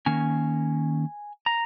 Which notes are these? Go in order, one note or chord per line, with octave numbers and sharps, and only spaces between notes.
D#3 A#3 C#4 G#5
A#5